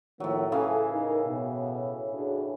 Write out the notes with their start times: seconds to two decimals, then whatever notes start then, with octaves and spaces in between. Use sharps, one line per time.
0.20 A2 D#3 F3 F#3 A#3
0.52 C#3 E3 A4 F5
0.92 D#4 A#4
1.27 B2
2.13 D4 F#4 G#4